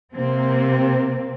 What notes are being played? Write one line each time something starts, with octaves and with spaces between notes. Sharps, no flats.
C3 A#3 C4